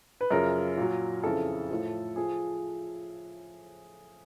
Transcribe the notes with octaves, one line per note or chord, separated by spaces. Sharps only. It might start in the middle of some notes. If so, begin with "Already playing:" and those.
B4
F#2 C#3 F3 A#4
A#2 F#3
F2 C#3 E3 A4
A2 F3
F3 G#4